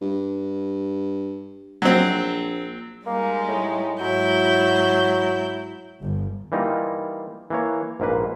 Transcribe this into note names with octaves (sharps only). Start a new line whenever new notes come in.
G2
A#1 F#3 C4
G3 G#3 A#3 D#4
A2
G#2 F#3 E4 G6
G1
E3 G3 A#3 D#4 F4
E3 A#3 C#5
A#1 G#2 A#3 B4